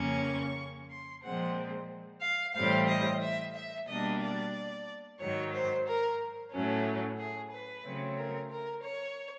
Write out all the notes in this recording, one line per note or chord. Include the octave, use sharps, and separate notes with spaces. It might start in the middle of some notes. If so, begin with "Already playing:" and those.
Already playing: F2 C#3 F3 A#3 C#4 C#6
C6
A#2 F3 G#3 C4 F#5
F5
A2 E3 G3 C4 F5
D#5
E5
E5
B2 G3 A#3 D4 D#5
D5
G#2 D#3 F#3 C#5
C5
A#4
A2 F#3 A3 C#4
G#4
B4
C#3 F#3 A3 C4
A#4
A#4
C#5